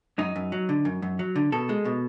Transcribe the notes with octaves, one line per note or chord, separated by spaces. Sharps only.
F#2 D#4
F#2
F#3
D3
F#2
F#2
F#3
D3
B2 A4
G#3
B2